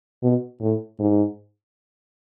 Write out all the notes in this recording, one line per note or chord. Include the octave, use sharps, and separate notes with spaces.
B2
A2
G#2